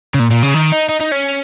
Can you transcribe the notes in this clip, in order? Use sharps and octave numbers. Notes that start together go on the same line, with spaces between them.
C#3
A#2
A#2
C#3
D#3
D#4
D#4
D#4
C#4